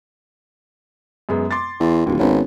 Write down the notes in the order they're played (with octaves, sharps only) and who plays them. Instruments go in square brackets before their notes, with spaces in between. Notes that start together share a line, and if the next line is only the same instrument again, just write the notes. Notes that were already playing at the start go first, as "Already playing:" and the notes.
[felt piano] F#2 G#3 B3
C6 D6 A6
[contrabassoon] E2
[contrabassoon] D1 [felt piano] D#2 F4
[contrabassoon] G#1 [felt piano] B3 C#4